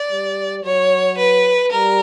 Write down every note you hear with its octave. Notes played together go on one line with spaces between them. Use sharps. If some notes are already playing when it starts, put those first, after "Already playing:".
Already playing: D5
G3
F#3 C#5
B4
G3 A#4